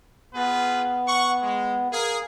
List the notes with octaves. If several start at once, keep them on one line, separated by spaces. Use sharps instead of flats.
B3 F4 G#4 B4
F#5 C#6
G#3
G#4 A#4 F5